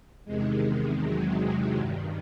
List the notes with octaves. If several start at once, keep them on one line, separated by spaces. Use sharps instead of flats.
E2 C3 D#3 G#3
F#3
G2 D#3